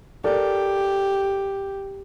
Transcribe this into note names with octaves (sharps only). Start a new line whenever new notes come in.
G4 A4 A#4 D5